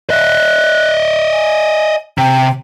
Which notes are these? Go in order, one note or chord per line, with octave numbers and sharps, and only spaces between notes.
D#5 E5 F#6
G#5
C3 G5